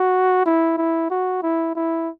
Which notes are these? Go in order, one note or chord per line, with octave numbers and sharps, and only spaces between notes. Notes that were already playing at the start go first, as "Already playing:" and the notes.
Already playing: F#4
E4
E4
F#4
E4
E4